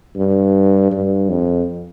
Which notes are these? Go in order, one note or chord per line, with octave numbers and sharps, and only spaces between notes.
G2
G2
F2